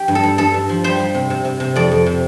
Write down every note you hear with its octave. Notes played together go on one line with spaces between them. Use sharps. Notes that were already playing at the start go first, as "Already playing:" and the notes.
Already playing: G4
G2
A4
G2
G2 A4
G2
F3
G3 C5
G3
C3
C3
C3
C3
F2 D5
F2
C3